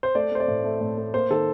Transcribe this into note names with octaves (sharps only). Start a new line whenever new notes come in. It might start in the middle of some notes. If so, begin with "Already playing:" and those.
C5
A3 D5
A3 C5
D5
A2
A3
A2
A3
A#3 C5
D#3 A4